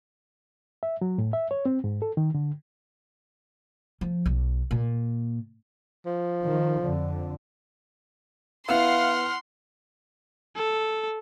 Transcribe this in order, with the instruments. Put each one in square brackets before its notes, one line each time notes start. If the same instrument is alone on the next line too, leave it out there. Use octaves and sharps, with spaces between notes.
[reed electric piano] E5
F#3
A2
E5
C#5
C4
G#2
A4
D#3
D3
[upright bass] F3
B1
A#2
[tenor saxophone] F3
[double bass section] D#3
F2 D3
[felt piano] B3 E4 [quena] F5 [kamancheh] F#5 F6 [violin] C6
[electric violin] A4